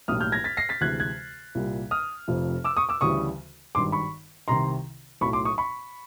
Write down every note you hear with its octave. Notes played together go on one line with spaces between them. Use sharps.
B1 A2 E3 G3 A#3 D#6 F6
F6 G6
G#6 A#6
A6 B6
A#6 C7
A6 B6
D2 C3 E3 G#3 F#6 G#6
F#6 G#6
C2 A#2 G3 A#3
D#6 F6
F1 F2 C3 F3 A3
D6 E6
C#6 D#6
D6 E6
D2 C#3 E3 G3 C#6 D#6
G#1 G2 D#3 C6 D6
B5 C#6
C2 C3 D#3 A#5 C6
B1 A2 F#3 A3 B5 C#6
C6 D6
C#6 D#6
B5 C#6